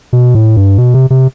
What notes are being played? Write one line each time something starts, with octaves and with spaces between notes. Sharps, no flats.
B2
A2
G2
B2
C3
C3